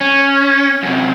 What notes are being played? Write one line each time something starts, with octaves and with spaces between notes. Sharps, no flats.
C#4
F#2 C3